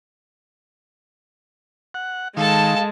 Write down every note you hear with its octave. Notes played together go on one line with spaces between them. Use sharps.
F#5
D#3 G#3 A4 F5 A5